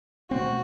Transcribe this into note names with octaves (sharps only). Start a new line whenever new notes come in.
B2 A3 C4 F#4